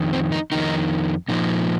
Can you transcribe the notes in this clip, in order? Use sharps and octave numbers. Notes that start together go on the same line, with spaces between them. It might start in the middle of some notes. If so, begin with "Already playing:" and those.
Already playing: F2 D#3
C4
D#4
F2 D#3 D#4
A#2 F3 D#4